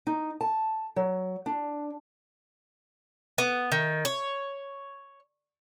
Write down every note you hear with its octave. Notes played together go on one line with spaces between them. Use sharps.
D#4
A5
F#3
D4
B3
D#3
C#5